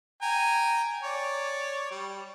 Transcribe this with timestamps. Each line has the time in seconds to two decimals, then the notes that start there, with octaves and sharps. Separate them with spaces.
0.22 G5 G#5 A#5
1.03 C#5 D5
1.91 G3